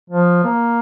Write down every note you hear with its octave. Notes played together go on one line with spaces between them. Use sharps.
F3
A#3